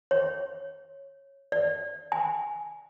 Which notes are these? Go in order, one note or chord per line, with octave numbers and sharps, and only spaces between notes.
C#5
D5
G#5